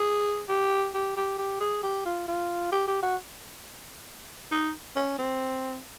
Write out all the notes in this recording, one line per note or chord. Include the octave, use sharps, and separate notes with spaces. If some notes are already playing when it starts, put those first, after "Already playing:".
Already playing: G#4
G4
G4
G4
G4
G#4
G4
F4
F4
G4
G4
F#4
D#4
C#4
C4